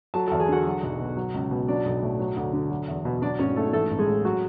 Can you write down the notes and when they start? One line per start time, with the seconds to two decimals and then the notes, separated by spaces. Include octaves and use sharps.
0.14 F#3 A4 A5
0.27 A4 A5
0.31 E2
0.40 G#4 G#5
0.49 D3 F#4 F#5
0.66 F#3
0.83 B1
0.99 B2
1.17 F#3
1.34 C#2
1.51 B2
1.68 F#3 D4 D5
1.85 B1
2.02 A2
2.19 F#3
2.37 D2
2.53 D3
2.70 F#3
2.88 E2
3.05 B2
3.22 F#3 D4 D5
3.39 G#1 C#4 C#5
3.56 G#2 A3 A4
3.73 E3 A3 A4
3.91 A1
3.99 G#3 G#4
4.07 A2
4.25 F#3 F#4